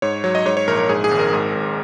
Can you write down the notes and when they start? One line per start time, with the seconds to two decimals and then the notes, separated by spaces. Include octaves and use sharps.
0.02 G#2 C#5
0.24 F#3 C#5
0.35 D#5
0.46 G#2 C#5
0.57 C#5
0.67 A#1 A#4
0.79 A#4
0.89 G#2 G#4
1.04 G#4
1.11 G#1
1.19 A#4
1.33 G#2
1.55 G#1